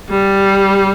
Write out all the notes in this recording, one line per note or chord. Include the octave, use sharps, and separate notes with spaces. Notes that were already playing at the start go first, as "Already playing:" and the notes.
G3